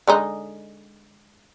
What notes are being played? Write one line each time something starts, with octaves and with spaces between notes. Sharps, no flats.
D3 G#3 D#4